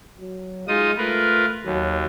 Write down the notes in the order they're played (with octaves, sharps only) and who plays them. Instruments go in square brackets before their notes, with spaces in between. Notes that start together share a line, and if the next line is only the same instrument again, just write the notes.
[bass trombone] F#3
[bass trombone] G#3 [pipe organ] D#4 F4 D#6
[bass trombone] A3 [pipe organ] F4 A#4 B4
[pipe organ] D#2 [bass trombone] F#3